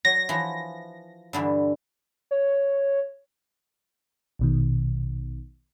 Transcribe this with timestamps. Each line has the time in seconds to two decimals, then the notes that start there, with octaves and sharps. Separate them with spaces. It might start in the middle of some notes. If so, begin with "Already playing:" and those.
0.05 F#3 A#6
0.29 E3 F3
1.33 G2 D3 E3
2.31 C#5
4.39 A#1 B2 D#3